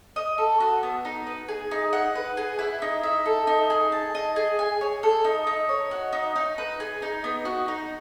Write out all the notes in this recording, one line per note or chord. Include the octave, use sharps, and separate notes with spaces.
D#5
A4
F#4
B3
D#4
B4
G#4
D#4
F#5
B4
G#4
E4
D#4
E5
A4
D#4
G#4
A5
D#5
G#4
G#5
C#5
A4
D#4
D#4
C#5
F#4
D#4
D#4
B4
G#4
D#4
B3
F#4
D#4